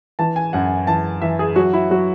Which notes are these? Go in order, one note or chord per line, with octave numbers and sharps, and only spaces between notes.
E3 A5
G#5
F#2 F#5
E3 A5
E3 E5
G#4
F#3 F#4
E4
F#3 F#4